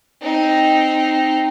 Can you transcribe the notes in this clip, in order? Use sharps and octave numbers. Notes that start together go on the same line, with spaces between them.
C4 D#4